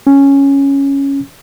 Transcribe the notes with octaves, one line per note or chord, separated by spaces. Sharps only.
C#4